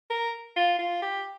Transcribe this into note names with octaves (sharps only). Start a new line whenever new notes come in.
A#4
F4
F4
G4